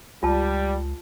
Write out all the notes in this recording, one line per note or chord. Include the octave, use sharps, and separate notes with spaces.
C#2 G3 F4 A5